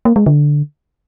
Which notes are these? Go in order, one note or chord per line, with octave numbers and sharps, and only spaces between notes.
A#3
G#3
D3